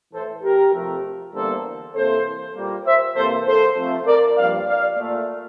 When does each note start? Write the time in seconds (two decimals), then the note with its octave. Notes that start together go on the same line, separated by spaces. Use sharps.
0.12 A2 E3 A3 A4 C5
0.43 G4 A#4
0.73 F2 C3 F3 A3
1.33 E2 D3 G3 A#3 A4 C5
1.94 C3 E3 A#3 A4 C5
2.55 A#2 G3 A#3
2.85 C5 E5
3.16 C3 E3 A#3 A4 C5
3.46 A4 C5
3.77 C3 F3 A3
4.07 A#4 D5
4.37 G2 F3 A#3 D5 F5
4.67 D5 F5
4.98 A#2 A3